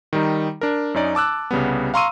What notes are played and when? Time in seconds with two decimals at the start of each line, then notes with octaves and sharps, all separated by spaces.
0.13 D#3 G3 D#4
0.61 D4 A#4
0.94 F#2 C#4 D#4 D5
1.15 A5 D6 E6 F#6
1.51 C2 C#3 G3 B3
1.94 F5 A#5 C6 C#6 E6 D#7